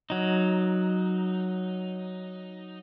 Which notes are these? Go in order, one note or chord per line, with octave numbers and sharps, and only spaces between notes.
F#3 D#4